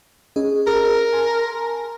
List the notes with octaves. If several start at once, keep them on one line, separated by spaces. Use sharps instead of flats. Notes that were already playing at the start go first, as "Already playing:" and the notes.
C#4 G#4 D#5
G#4 A#4
G#5 A5 C6